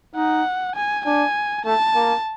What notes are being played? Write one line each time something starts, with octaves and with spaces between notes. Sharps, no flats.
D#4 F#5
G#5
D4 G#5
A3 A5
A#3